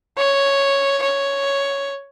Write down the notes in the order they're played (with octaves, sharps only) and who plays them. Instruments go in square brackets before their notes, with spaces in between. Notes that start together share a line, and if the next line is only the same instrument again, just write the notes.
[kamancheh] C#5
C#5